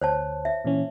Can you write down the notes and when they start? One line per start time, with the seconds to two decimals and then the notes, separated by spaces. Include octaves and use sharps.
0.01 D2 C5 C#5 A5
0.45 E5
0.64 A#2 E3 C#4